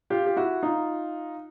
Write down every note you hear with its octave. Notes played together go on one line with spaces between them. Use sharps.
F4 G4
G4
E4 F#4
D#4 F4